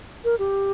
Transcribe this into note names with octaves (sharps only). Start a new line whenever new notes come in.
A#4
G4